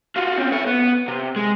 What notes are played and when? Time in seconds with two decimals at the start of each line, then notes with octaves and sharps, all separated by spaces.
0.16 F4 F#4
0.37 C4 C#4
0.52 A4 C#5
0.66 B3
1.08 C3
1.36 G#3